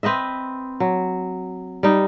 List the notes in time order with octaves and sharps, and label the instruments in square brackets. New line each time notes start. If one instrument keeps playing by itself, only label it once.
[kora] C4 B4 D#5 E5
F#3
G3 D#4